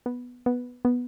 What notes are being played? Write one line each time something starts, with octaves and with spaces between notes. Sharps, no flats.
B3
B3
B3